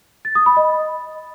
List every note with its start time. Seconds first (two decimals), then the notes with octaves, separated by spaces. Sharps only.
0.25 A6
0.35 D#6
0.46 B5
0.57 D#5